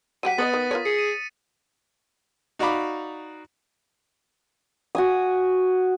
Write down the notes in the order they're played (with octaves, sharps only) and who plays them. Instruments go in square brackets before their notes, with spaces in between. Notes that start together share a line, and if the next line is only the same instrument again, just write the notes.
[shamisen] F#3 G4 F#5 [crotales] B6 D#7
[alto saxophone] B3 [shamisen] B4 C#5 D#5 [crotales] D#6 A6
[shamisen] D#3
F4 A#4 C#5
[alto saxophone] G#4 [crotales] C#7
[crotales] D#7
[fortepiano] D#4 F#4 D5 F5 B5 D6
[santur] F#4 G#5 D#6